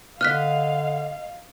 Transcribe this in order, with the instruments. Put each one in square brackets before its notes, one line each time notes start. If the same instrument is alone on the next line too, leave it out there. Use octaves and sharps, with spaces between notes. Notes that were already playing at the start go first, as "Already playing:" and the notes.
[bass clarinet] D3 [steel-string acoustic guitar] D#5 [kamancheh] F5 [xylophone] F6 F#6 B6